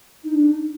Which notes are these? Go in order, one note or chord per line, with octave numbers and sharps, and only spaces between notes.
D#4
D4
D#4